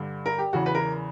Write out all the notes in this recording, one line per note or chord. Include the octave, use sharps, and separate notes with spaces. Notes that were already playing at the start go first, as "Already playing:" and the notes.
Already playing: G2 D3
A#4
G4
E2 C#3 E3 F#4
B4
A#4